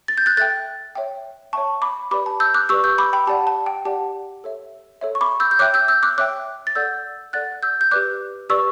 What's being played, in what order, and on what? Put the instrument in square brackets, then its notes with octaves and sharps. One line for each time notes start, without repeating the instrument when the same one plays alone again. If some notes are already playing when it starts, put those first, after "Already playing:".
[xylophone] A6
G6
F#6 A6
A4 E5 G5 F#6 A6
C#5 E5 G5
C#5 E5 G5 A5 C#6
B5 D6
G4 B4 D5 B5 D6
A5
E6 G6
D6 F#6
G4 B4 D5 C#6 E6
E6 G6
B5 D6
G5 B5
G4 D5 F#5 A5
A5
G5
G4 D5 F#5 A5
A4 C#5 E5
A4 C#5 E5
C#6
B5 D6
E6 G6
G6
C#5 E5 G5 D6 F#6
E6 G6
E6 G6
D6 F#6
C#5 E5 G5 D6 F#6
A6
A4 D5 F#5 E6 G6
A4 D5 F#5 F#6 A6
E6 G6
G6
G4 B4 D5 D6 F#6
G4 B4 D5 C#6 E6